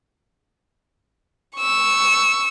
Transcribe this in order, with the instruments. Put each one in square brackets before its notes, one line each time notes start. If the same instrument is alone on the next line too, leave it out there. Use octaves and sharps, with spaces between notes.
[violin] C#6 E6